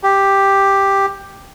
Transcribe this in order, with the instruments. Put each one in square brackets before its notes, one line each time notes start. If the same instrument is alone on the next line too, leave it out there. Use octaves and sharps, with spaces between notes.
[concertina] G4